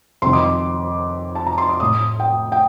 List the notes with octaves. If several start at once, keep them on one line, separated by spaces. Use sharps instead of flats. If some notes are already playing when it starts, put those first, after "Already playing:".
F2 D#3 C6
D6
C6
A5
A#5
C6
D6
A2 D#6
G5
G5